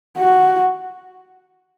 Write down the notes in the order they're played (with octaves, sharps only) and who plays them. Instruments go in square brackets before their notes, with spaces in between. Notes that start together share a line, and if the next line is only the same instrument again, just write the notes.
[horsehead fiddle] F#4